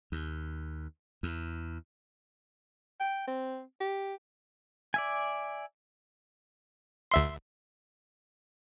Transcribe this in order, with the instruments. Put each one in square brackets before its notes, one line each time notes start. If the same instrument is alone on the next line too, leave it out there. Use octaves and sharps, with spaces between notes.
[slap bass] D#2
E2
[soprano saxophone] G5
C4
G4
[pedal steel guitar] D5 E5 G#5
[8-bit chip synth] D2 E5 C6